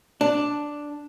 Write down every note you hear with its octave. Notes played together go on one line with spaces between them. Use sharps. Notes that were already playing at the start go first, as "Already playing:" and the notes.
D4